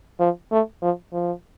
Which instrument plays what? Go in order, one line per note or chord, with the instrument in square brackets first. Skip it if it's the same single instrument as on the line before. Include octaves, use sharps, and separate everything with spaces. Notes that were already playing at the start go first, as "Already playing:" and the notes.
[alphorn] F3
A3
F3
F3